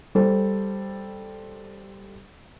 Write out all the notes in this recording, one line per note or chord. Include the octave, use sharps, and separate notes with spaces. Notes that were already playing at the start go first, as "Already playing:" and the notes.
G3 A4 C5